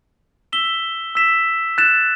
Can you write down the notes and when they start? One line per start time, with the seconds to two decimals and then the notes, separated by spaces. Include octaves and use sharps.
0.53 E6 B6 E7 G7
1.15 E6 B6 E7
1.78 F#6 A6 E7